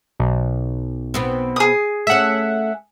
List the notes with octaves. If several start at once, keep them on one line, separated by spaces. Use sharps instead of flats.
B1
B2 B3 C4
G#4 D#6
A3 C#4 E5 F#5